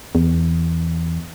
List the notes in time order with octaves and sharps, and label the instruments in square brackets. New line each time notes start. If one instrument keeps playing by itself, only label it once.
[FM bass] E2